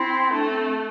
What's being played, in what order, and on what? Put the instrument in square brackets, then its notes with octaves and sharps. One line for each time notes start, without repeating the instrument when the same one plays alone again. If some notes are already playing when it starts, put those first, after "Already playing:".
Already playing: [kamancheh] C4 [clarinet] E4
[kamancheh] A3 [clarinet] D4
[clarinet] C4